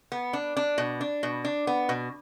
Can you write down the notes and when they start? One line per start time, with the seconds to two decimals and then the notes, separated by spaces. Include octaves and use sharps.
0.12 B3
0.33 D4
0.57 D4
0.78 B2
1.01 D4
1.23 B2
1.45 D4
1.67 B3
1.89 B2